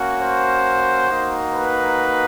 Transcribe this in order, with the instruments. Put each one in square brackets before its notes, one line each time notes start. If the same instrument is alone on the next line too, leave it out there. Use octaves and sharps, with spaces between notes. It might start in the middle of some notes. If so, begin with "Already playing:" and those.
Already playing: [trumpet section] A#3 C#4 F#4
C5
A#3 D#4 F#4
B4